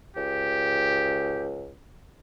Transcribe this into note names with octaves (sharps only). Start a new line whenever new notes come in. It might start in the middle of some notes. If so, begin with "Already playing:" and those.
C#2 G4